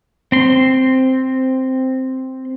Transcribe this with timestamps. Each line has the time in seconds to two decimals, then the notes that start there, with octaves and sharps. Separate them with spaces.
0.32 C4 C6